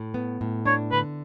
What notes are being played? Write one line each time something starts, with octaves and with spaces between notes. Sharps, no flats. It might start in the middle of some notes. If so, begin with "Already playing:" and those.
Already playing: A2
B3
A2
D4 C#5
D3 B4